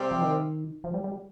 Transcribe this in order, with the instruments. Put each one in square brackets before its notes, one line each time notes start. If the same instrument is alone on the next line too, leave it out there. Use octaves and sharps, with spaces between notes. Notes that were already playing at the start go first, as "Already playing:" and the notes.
Already playing: [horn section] C3 G3 C4
[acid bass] F3
D#3
F3
G3
G3